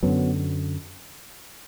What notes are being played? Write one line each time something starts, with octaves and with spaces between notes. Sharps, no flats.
F#2 D3 F#3 B3